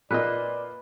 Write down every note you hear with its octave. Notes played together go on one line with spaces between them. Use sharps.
A#2 A#3 B4 D5 D#5